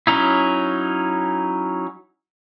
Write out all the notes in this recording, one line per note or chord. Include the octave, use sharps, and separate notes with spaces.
F#3 C#4 D#4 E4